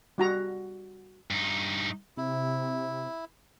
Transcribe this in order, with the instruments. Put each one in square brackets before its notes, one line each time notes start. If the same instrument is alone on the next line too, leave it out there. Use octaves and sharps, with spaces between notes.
[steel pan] G3 F#4 A#5
[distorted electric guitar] G2 D#4
[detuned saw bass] C3 [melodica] E4